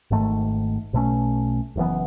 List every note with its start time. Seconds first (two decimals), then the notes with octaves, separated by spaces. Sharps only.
0.11 G#1 G#2 D#3 A3
0.93 B1 B2 A3 C#4
1.76 F#1 F#2 E3 B3